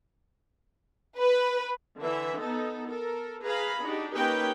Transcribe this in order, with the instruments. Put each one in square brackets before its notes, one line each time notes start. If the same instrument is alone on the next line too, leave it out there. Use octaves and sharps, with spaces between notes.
[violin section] B4
[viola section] D3 E3 E5
B3 D#4 A4
A4 A#4
G#4 B4 F5 A#5 B5
D4 D#4 F#4 G4
A#3 C#4 D#4 G4 B4 G5